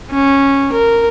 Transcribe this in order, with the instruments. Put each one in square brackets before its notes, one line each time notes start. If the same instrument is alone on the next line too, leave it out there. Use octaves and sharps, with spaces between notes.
[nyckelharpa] C#4
A#4